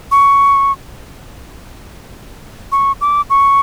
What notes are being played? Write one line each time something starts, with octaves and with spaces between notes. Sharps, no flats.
C#6
C#6
D6
C#6